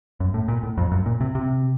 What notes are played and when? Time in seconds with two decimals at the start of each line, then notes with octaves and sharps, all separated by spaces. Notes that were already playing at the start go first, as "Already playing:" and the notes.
0.20 F#2
0.34 A2
0.48 A#2
0.63 A2
0.78 F2
0.92 F#2
1.06 A#2
1.21 C3
1.35 C3